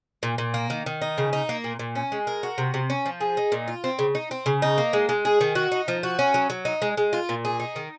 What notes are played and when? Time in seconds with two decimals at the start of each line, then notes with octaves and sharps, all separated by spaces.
0.23 A#2
0.38 A#2
0.54 A#3
0.70 D#3
0.86 D#3
1.02 D#4
1.18 C#3
1.33 D#4
1.49 A#3
1.64 A#2
1.79 A#2
1.95 C#4
2.12 G#3
2.27 A#4
2.43 F#4
2.58 C3
2.74 C3
2.90 C#4
3.06 F3
3.20 G#4
3.37 D#4
3.52 A#2
3.68 F4
3.84 C4
3.99 C#3
4.15 D#4
4.31 C4
4.46 C#3
4.62 D#4
4.78 A#3
4.93 G#3
5.09 G#3
5.25 G#4
5.41 D#3
5.55 F#4
5.72 D#4
5.88 F3
6.03 F#4
6.19 C#4
6.34 F#3
6.50 F#3
6.65 D#4
6.82 G#3
6.97 G#3
7.13 F4
7.29 A#2
7.45 G#4
7.60 D#4
7.76 D#3